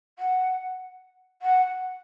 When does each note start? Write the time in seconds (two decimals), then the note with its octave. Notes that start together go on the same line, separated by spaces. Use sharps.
0.19 F#5
1.42 F#5